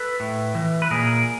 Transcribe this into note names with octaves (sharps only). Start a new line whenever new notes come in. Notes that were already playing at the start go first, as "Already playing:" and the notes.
Already playing: A4 B4
A2
E3
B4
A#2 G#4 A#4